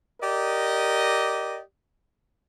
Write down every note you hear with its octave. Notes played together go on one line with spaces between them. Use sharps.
G4 A#4 D5 D#5